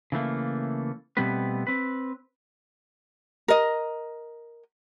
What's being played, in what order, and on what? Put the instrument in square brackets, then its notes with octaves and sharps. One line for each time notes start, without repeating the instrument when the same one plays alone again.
[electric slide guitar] C#3 E3 A3 A#3
B2 G3 A3 B3 C4 B4
C4 B4
[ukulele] A#4 D#5